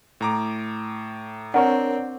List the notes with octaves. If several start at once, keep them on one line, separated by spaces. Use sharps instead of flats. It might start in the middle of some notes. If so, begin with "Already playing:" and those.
A2 A#5 D6
C4 D4 A#4 C#5 F#5